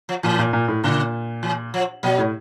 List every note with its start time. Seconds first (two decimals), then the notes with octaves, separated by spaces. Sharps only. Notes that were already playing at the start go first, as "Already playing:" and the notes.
0.09 F3
0.23 A#2 E3
0.39 A#2
0.53 A#2
0.68 A2
0.84 A#2 C#3
1.43 E3
1.74 F3
2.03 B2 F#3
2.18 A2